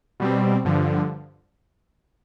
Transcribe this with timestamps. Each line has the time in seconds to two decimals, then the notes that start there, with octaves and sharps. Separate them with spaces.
0.20 B2 G3 C4
0.65 G2 D3 F3